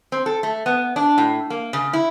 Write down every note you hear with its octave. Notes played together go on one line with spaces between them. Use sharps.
C4
A4
A3
B3
D4
A2
A#3
C#3
E4